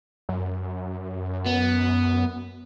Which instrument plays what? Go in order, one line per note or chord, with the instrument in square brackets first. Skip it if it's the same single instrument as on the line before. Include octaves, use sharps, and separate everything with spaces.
[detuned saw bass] F#2
[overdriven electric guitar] B3